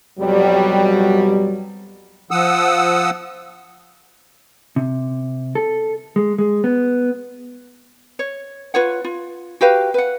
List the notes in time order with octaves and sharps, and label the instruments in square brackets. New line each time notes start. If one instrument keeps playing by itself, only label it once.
[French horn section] F2 B2 F#3 G3
[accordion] F3 F#5 D#6 E6
[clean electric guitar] C3
A4
G#3
G#3
B3
[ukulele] C#5
F4 B4 C#5 F#5
F4
F#4 G4 B4 F5
B4 F#5